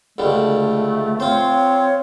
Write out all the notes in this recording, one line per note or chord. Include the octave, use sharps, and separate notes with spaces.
C#2 D3 G3 A3
C4 F4 C5 C#5